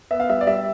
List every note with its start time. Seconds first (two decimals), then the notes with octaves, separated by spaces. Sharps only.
0.11 B3 E5
0.20 F5
0.29 G3 E5
0.41 D5
0.47 G3 E5